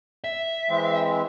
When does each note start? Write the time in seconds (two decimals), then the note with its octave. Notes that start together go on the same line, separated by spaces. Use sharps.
0.24 E5
0.69 E3 G#3 C4